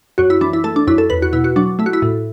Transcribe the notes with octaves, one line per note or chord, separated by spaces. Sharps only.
F#2 F#4
E4
E3 D4
E4
A3 A4
D4
F#2 E4
A4
E2 B4
F#4
B2 E4
F#4
F#3 D4
A3 E4
F#4
E4
A2